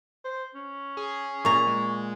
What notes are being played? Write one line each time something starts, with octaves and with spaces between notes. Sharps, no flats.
C5
C#4
G#4
A#2 A#5 C#6
G#3